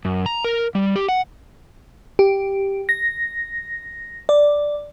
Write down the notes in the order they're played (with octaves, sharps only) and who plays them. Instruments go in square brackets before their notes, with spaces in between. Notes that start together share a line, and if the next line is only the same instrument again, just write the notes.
[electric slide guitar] F#2
A#5
A#4
G3
G4
F#5
[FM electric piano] G4
A#6
D5